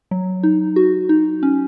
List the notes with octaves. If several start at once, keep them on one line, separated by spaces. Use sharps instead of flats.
F#3
D#4
F#4
D#4
C#4